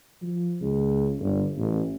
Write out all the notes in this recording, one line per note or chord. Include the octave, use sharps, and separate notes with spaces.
F3
C#2
G1
A1